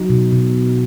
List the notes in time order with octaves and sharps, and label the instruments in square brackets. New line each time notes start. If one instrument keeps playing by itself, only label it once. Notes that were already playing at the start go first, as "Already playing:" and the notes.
Already playing: [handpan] F#3 D#4 F#4
B2
B2